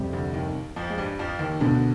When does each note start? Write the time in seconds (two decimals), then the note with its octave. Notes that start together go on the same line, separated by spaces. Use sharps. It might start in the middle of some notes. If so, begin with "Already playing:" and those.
Already playing: F2 C3 G3
0.13 D2 D3
0.33 D#2 D#3
0.76 F2 F3
0.90 G#3
0.98 G2 G3
1.19 F2 F3
1.39 D#2 D#3
1.60 D2 B2 D3 B3 D4